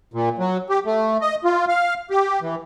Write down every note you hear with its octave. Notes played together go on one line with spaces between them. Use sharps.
A#2
F#3
G4
A3
D#5
F4
F5
G4
E3